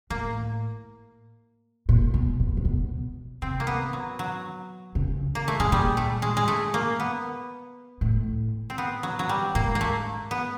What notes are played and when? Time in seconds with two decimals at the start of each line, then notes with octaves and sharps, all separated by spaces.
0.10 A2 A#3
1.89 A#2
2.14 B2
2.40 A#2
2.57 C3
2.65 B2
3.42 C3 C4
3.60 A#3
3.67 B3
3.93 F#3
4.19 F#3
4.95 C#3
5.35 A#3
5.48 A3
5.59 A2 G#3
5.72 A#2 G3
5.97 A3
6.22 G#3
6.37 G#3
6.48 A3
6.74 A#3
7.00 B3
8.01 A2
8.70 C4
8.78 B3
9.03 F#3
9.19 F#3
9.29 G3
9.55 G#2 A#3
9.75 A#3
9.81 A3
10.31 B3